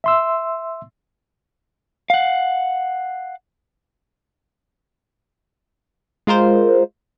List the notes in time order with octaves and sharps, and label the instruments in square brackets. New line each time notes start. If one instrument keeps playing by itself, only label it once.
[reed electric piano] E5 C6 E6
[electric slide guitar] F5 F#5
[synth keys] G#3 F4 A#4 C5